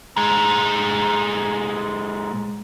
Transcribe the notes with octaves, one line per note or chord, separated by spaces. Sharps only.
A#2 G#3